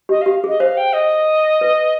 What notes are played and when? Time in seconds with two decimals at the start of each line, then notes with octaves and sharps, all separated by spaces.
0.09 G4 D#5
0.22 G4 F5
0.44 G#4 D#5
0.60 C5 F5
0.77 G5
0.93 D#5
1.61 B4